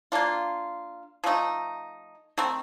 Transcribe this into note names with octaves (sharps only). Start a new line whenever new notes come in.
A#3 D4 F4
F3 A3 D#4
D#3 A3 C4